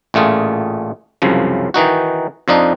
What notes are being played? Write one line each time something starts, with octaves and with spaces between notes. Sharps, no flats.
A1 A#2 A3 F4 G#4
C2 F#2 C#3 F3
D#3 E3 D#4 F#4
F2 F3 D4 D#4